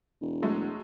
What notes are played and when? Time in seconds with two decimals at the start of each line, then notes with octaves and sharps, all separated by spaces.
0.21 E1
0.42 F#3 G#3 A3